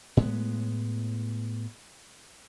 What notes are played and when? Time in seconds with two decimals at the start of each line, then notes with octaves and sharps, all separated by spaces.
0.17 A2 G#3 B3